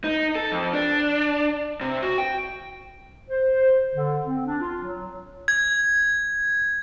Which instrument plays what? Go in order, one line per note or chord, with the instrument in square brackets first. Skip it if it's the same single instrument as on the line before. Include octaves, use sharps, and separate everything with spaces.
[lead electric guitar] D#4
A4
F2
D4
C3
F#4
G5
[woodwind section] C5
D3
C4
D4
F4
F#3
[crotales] G#6